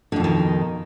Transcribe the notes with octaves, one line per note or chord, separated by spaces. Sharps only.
F2 B2 D3 D#3